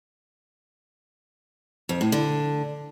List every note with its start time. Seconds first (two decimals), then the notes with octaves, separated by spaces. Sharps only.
1.89 F2
2.01 A2
2.12 D3